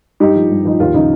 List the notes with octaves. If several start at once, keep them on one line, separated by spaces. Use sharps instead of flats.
G2 D#4 G4
F3
G2
F3 D#4
D#2 F4
C#3 F3 D#4